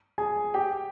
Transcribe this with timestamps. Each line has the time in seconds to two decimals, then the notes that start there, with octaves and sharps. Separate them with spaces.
0.18 G#4 G#5
0.54 G4 G5